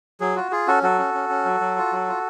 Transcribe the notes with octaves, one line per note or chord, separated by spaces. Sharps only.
F#3 G#4
F4 F#4
F4 G#4
C#4 F#4 A4
F#3 F#4 A4
C#4
C#4
C#4
F#3
F#3
F4
F#3
F4